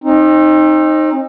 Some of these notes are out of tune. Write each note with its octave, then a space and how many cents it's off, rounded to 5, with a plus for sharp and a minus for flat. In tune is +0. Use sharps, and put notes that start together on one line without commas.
C4 +35 D#4 -5